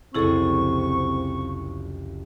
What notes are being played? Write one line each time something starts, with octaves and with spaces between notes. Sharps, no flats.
F#1 C2 F2 C4 E4 G#4 A4 C#6